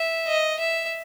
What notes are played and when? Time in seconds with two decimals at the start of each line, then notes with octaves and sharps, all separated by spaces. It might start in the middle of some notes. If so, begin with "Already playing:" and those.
Already playing: E5
0.27 D#5
0.59 E5